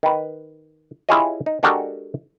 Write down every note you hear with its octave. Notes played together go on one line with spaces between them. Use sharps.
D#3 B4
E4 F4 G4 G#4 C#5 D#5
D#4
G#3 D4 F#4 G4 A4 A#4